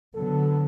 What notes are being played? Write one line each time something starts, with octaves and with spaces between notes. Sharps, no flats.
D3 F#3 B3 A4